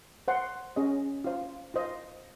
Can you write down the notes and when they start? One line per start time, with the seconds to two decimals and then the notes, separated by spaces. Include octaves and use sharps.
0.28 C5 F#5 C6
0.76 C#4 G#4 D#5
1.24 F4 C5 F5
1.74 F4 C5 D#5